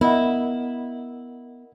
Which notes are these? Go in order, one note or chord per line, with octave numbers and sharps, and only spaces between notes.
B3 E4 A#4 D#5 F#5